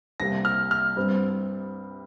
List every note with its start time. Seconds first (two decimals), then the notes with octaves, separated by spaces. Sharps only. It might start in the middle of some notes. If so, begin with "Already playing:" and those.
0.20 C2 C3 A#3 A#6
0.45 F6
0.71 F6
0.96 G2 G3 C4